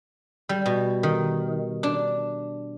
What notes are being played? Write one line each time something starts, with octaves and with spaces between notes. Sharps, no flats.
G3
B2
D#3
D4